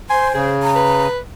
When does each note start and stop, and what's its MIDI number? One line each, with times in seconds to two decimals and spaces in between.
0.10 0.49 72
0.10 0.31 80
0.10 0.28 84
0.34 1.08 49
0.34 0.70 68
0.63 1.06 82
0.75 1.19 71